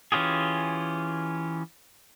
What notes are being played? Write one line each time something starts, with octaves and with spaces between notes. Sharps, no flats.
E3 C#4 F4 G4 G#4